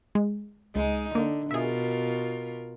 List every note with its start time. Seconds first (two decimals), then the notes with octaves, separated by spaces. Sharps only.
0.15 G#3
0.76 C#2 G#3 D#4
1.15 D3 A#3
1.51 B2 F4 G#4 A#4 E5